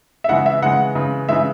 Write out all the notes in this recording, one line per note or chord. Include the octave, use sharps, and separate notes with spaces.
E5
C#3 E3 G#3 F#5
E5
C#3 E3 G#3 F#5
C#3 E3 G#3
C#3 E3 G#3 E5